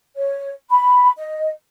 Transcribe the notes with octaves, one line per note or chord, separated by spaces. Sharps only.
C#5
B5
D#5